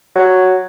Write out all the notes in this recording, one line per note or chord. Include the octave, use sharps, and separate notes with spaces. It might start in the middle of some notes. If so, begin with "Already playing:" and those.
F#3